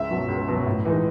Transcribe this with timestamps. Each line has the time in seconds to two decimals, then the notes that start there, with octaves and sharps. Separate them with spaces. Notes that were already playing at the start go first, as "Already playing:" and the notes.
Already playing: C#2 E5
0.10 B2 F#3
0.28 C#2
0.48 B2 F#3
0.67 A2
0.85 E3 G#3 D#4